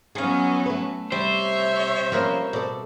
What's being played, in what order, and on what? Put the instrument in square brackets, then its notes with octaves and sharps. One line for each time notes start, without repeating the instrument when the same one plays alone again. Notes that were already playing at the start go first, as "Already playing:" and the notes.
[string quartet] F#3 B3 C#4 [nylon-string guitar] D#4 [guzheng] G#4 F5
[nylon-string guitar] A3 B4
[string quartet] C3 C#5 E5 [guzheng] G3 [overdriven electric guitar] C5
[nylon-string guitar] F3 A#3 C#4 [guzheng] C4 A#4 B4
[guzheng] B2 [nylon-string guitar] A4 D5